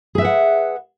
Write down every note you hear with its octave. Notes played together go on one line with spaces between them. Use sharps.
G#4 B4 E5 F#5